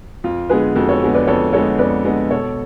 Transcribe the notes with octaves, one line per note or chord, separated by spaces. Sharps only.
F2 F4
D3 G#3 B3 G#4 B4
F2 F#4 A4
A4 C#5
D3 G#3 B3
B4 D5
F2 A4 C#5
D3 G#3 B3 A4 C#5
F2 B4 D5
D3 G#3 B3
B2 A4 C#5